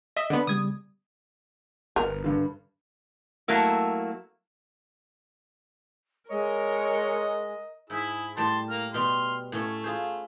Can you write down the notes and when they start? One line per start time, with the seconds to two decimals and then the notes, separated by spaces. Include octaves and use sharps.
0.16 D#5 E5
0.30 D3 B3
0.47 C#3 G3 D#6 G#6
1.96 G1 A#4 B4
2.24 G2 D3
3.48 F#3 A3 A#3 E4
6.30 G#3 A#4 C#5 D#5
7.90 G#2 E4 G#4
8.37 A2 G3 A5 C6
8.69 A#3 F6
8.94 B2 G3 C6 F6
9.52 A2 A3 C#4 C#5
9.84 F4 G#4 C5